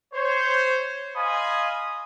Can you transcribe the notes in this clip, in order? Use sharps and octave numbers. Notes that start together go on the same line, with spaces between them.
C5 C#5
D#5 F5 G#5 B5 C6 D#6